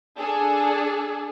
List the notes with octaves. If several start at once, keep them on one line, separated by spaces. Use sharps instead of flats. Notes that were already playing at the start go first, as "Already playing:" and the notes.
D4 G#4 A4